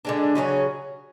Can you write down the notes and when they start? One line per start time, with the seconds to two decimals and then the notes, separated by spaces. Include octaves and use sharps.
0.05 D3 G#3 D4
0.35 C#3 F#3 C#4 G#4